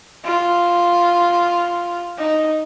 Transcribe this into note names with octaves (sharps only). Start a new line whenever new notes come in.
F4
D#4